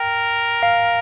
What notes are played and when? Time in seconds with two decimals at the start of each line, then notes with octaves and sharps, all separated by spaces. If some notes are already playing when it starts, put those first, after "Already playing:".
Already playing: A#4 G5
0.63 F5